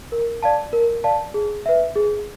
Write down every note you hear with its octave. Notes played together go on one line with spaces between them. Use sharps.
A#4
D5 F5 A5
A#4
D5 F5 A5
G#4
B4 E5
G#4